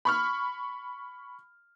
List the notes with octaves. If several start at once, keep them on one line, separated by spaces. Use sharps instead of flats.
B5 C#6 F6